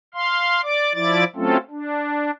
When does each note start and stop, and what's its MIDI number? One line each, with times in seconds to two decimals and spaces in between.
0.14 0.61 77
0.14 0.61 84
0.63 0.94 74
0.63 0.94 86
0.94 1.24 53
0.94 1.24 64
0.94 1.24 74
0.94 1.24 86
0.94 1.24 93
1.36 1.57 54
1.36 1.57 57
1.36 1.57 60
1.36 1.57 61
1.36 1.57 65
1.36 1.57 69
1.70 2.31 62